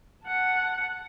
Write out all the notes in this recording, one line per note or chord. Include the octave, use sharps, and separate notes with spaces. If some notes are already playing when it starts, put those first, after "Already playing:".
F#5 A5